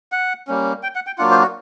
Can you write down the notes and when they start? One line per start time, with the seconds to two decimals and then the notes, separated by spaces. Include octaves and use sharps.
0.12 F#5
0.48 G3 A#3 C#4
0.83 G5
0.95 F#5
1.07 G5
1.18 F#3 A#3 D4 F4 F#5
1.31 C5
1.42 F#4